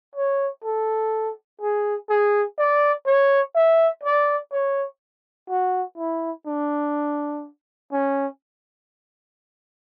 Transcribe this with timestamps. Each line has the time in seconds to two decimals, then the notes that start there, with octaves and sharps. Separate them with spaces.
0.15 C#5
0.64 A4
1.61 G#4
2.09 G#4
2.58 D5
3.07 C#5
3.55 E5
4.04 D5
4.52 C#5
5.50 F#4
5.98 E4
6.47 D4
7.92 C#4